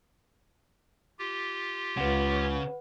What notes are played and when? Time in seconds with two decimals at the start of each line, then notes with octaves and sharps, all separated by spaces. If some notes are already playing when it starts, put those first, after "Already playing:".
1.19 F4 G4
1.97 C#2 C#3 B4 F#5